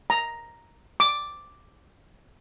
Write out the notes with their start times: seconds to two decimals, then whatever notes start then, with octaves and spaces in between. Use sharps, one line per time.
0.10 A#5
1.00 D6